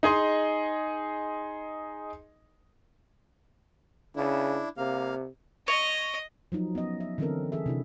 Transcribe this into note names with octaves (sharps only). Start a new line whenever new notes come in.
D#4 G#4 D#5 C6
C#3 D4 E4
C3 A#3 F5
C#5 D#5
F3 F#3 D#4
B3 C#4 D#5
E5
D3 E3 C4 C#4 A4 A#4
E3 G#4 A4 E5
C3 D4 E4